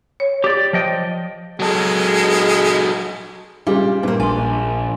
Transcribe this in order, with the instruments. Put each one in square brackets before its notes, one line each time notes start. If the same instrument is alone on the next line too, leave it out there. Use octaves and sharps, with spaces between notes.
[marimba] C#5
[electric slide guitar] G4 D5
F3 D#5 G5
[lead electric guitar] F#3 A4 [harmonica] G#3
[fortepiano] A#2 C#3 G#3 [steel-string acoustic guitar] G3
[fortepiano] G2 A#3 [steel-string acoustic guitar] A#2 C4
[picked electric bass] A#1 [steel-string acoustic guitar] D4 [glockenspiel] G#5 C6